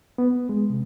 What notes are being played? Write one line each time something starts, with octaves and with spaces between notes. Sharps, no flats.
B3
G#3
C3